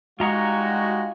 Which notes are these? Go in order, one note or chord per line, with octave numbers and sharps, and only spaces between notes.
G3 G#3 D#4 F4 F#4 A#5 C#6